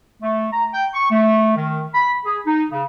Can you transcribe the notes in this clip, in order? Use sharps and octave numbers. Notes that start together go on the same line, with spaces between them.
A3
A#5
G5
C#6
A3
D#3
B5
G#4
D#4
C#3